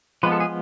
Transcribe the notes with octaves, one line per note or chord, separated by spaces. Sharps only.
F3 G#3 B3 B4
A4
G#4